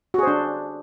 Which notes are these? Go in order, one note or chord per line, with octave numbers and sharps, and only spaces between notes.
D4 F#4 G#4 C5